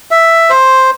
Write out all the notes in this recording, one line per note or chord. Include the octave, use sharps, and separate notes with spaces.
E5
C5